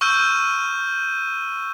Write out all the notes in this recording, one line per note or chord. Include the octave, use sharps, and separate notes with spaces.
C#6 E6 F6 G6 D#7